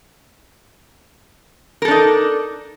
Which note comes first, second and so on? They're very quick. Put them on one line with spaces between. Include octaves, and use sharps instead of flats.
A#4 A4 D4 D#4